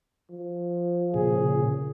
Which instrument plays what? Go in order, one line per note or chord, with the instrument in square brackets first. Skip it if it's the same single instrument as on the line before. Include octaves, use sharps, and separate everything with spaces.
[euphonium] F3
[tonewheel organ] A#2 C#3 [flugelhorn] G#4